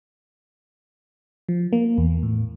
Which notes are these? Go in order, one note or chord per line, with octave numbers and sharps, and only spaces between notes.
F3
A#3
E2
A2